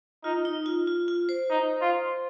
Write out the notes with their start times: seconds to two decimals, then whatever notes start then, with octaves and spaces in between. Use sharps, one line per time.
0.24 D#4 F4
0.45 D#4
0.66 F4
0.87 F4
1.08 F4
1.29 C5
1.50 D#4
1.81 F4